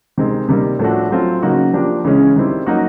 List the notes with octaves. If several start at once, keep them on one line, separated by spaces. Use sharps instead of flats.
C3 D#3 G#3 C4
C3 D#3 G3 A#3
A2 F3 A3 D4 F#4
F#3 A3 C4 F4
C#3 F#3 A#3 D#4 F#4
F3 A#3 D4 G4
C#3 E3 G#3 C#4
D#3 G3 C4 E4
F#3 A#3 D#4 F#4